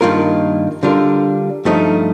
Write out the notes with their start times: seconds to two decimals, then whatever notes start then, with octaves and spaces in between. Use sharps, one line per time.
0.01 G2 D#3 A#3 F4 A#4
0.83 D3 G3 D4 F4 A#4
1.65 G2 F3 A3 D#4